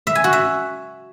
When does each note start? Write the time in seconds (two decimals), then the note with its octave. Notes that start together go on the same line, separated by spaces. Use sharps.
0.07 E5
0.15 G#5
0.24 F#4
0.33 E5